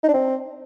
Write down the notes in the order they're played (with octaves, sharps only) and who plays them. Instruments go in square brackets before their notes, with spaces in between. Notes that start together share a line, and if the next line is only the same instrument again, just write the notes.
[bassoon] D#4
D4
C4